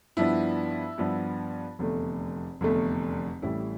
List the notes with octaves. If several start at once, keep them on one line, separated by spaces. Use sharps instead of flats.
G2 F3 B3 D4 E4
G2 F3 B3 D4
F1 E2 D3 A3
F1 E2 D3 A3
A1 A2 G3 E4